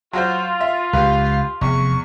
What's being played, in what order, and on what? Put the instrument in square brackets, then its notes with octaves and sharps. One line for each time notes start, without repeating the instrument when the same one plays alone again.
[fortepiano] F#3 F#4 C5 [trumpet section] F4
[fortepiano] E5
[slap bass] C#2 [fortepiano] G4 B4 [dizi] F5
[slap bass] F1 [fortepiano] E2 [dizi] C#6